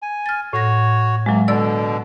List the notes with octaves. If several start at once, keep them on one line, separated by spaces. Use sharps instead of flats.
G#5
F6 A6
A2 F#4 C#5 A#6
C3 F#3 G#3 A#3
B2 D3 A4 D5 E6